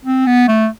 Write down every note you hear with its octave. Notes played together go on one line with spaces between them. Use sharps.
C4
B3
A3